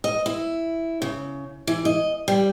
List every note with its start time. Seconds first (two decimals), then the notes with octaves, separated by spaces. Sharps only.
0.04 D#5
0.26 E4
1.02 C#3
1.67 E3
1.85 D#5
2.28 G3